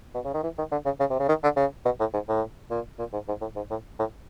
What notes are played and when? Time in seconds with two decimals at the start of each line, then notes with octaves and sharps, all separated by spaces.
0.14 B2
0.24 C#3
0.34 D#3
0.43 E3
0.58 D#3
0.72 D3
0.85 C#3
1.00 C#3
1.10 C3
1.19 C#3
1.29 D#3
1.43 D3
1.57 C#3
1.85 B2
2.00 A2
2.13 G#2
2.28 A2
2.71 A#2
2.99 A#2
3.13 G#2
3.28 G#2
3.41 A2
3.56 G#2
3.70 A2
3.99 A2